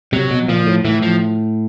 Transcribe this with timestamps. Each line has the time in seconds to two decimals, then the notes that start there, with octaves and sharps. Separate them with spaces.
0.13 C3 F#3
0.31 B2
0.48 A#2 F3
0.67 A2
0.85 A2 E3
1.02 F3